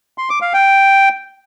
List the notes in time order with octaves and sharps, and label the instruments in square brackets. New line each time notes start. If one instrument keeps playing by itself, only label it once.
[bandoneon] C6
D6
F5
G5